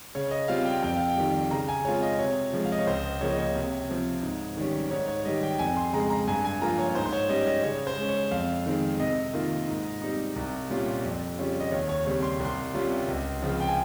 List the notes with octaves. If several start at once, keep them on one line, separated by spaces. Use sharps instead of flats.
C#3 C#5
D#5
G3 C4 F4 F5
G5
F2 G5
F5
G5
D#3 G3
C#3 A#5
G#5
G#3 C4 F4 C#5
D#5
C3 C#5
F3 G#3
F5
D#5
C#5
C#2 C5
C#3 F3 A#3 C#5
D#5
C#5
C3
F3 C4
G#2
D#3 G3 C#4
G#2 C#5
C#5
D#3 G3 D#5
G5
F2 G#5
C6
C#3 G#3 A#5
A#5
G2 G#5
G#5
F3 A#3 F4 A#5
C#5
C#5
G#2 C5
C5
C#5
G3 C#4 D#5
D#5
C#3 C#5
C5
G#3 C#4
C#5
F2 F5
D#3 G#3 C4
C3 D#5
D#3 A#3 F4
G#2
G3 C4 D#4
C2
A#2 G3 C#4 F4
F2
C#3 G3 C#4 F4
D#5
D#2 C#5
C#5
C#3 G3 C4 C#5
C6
C2
C6
C3 G3 C#4 F4
C#2
C#3 F3 C4 F4
G5
G#5